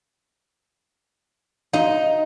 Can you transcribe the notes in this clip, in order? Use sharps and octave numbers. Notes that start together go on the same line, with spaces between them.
D#4 F#4 F5